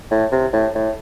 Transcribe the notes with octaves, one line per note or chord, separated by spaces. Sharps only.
A2
C3
A2
A2